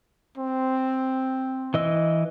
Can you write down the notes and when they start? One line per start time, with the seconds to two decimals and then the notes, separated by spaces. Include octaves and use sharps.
0.37 C4
1.74 E3 D#5 E6